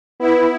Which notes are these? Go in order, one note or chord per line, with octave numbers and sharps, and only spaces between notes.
B3 E4